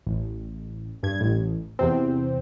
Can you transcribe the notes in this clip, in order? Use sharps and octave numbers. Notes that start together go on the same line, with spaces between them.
A1
G2 G#6
A1
E2 C3 C4